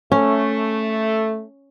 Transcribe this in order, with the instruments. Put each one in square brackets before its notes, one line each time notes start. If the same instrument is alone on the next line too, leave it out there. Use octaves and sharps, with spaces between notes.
[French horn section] A3 [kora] C#4